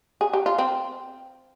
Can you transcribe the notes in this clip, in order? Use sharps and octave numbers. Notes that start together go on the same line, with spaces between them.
G#4
G4
F4
C4